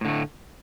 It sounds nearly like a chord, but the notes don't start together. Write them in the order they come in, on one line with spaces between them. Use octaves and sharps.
A2 D3 A3